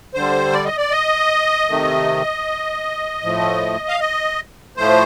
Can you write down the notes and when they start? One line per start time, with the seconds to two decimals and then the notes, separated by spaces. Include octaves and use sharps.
0.14 D3 G3 C5
0.53 D5
0.65 D#5
0.77 D5
0.91 D#5
1.68 C3 D#3 A3
3.22 A2 F3 A3
3.88 F5
4.00 D#5
4.77 A2 F3 A3 C5